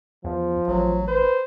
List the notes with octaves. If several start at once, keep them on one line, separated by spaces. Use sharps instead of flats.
E2 F3
A1 F#3
B4 C5